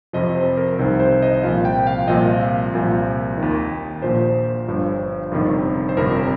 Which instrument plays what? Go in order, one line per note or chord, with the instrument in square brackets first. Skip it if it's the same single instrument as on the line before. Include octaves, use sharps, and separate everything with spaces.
[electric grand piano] F2 C3 F3 D#5
C5
A#4
C2 C3 D#3 C5
C5
D#5
C2 A#2 F3 F5
G5
F5
C2 A#2 F3 D#5
F5
C2 A#2 F3
D#2 D#3
A#1 A#2 F3 C5
G1 G2 F3
G1 F2 C3 D#3
C5
G1 F2 C3 F3 A#4